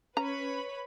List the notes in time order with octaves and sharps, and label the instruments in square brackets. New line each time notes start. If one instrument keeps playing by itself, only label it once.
[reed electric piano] C#4 [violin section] B4 C#5 B5 [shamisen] A#5